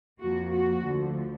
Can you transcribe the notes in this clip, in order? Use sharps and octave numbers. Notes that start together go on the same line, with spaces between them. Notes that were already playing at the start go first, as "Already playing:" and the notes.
F2 F3 A#3 F#4
F#4
D2 D3 F3